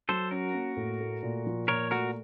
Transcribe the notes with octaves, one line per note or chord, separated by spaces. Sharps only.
F#3 A4 C5
C#4 F#4 A#4
A#3
A2
A3
A#2
F3
A#2 A#4 C#5
A3 F#4 A#4